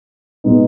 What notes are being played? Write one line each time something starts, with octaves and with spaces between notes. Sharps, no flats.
B2 G#3 B3 D#4